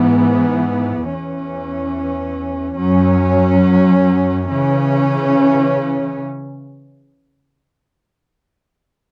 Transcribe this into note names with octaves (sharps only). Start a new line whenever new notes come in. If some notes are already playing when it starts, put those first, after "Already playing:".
Already playing: G#2 E3 B3
E2 E3 C#4
F#2 F#3 C#4
C#3 E3 C#4